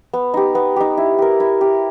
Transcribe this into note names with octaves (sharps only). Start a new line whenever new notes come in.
B3
D#4 G4
B3
D#4 G4
E4
G4 A#4
E4
G4 A#4